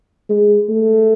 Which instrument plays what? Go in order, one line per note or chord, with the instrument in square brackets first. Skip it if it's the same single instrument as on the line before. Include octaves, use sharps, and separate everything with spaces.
[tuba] G#3
A3